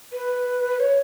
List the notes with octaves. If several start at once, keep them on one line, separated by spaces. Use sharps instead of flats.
B4
C#5